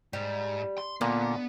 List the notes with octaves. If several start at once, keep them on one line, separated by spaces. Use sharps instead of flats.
G#2 G3
C6
A#2 D3 A#3 B3